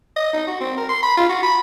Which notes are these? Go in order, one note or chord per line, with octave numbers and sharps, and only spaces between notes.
D#5
D#4
F#4
C4
A#4
C6
B5
F4
F#4
B5